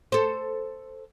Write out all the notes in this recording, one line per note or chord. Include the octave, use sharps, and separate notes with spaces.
A4 C5